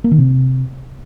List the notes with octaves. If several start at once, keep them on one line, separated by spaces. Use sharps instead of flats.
A#3
D#3
C3